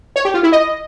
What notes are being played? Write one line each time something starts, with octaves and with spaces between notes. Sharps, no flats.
C#5
G4
F4
E4
D#5